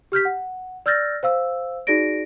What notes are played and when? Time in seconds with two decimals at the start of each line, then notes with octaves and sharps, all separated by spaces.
0.12 G4 F6 G6 B6
0.25 F#5
0.86 D5 E6 F6 G6 A6 A#6
1.23 C5 F5 E6
1.87 D#4 F#4 G#4 D5 A#6 D7